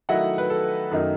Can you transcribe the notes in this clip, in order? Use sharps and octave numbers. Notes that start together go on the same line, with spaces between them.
D#3 F#3 A3 E4 D#5 F#5
B4
A4
F#2 D#3 A3 D#4